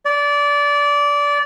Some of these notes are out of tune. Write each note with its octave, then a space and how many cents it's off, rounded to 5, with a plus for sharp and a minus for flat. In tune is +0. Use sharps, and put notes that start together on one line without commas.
D5 -20